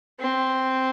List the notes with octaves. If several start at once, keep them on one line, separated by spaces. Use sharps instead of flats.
C4